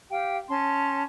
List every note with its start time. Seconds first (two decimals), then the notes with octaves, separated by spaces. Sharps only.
0.11 G4 F5 G5
0.49 C#4 A5 C6